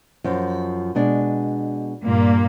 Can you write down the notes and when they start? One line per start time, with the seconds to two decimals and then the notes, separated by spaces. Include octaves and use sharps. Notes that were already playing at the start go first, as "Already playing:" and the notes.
0.24 F#2 F3
0.95 B2 G#3 D4
2.03 G2 A#2 A#3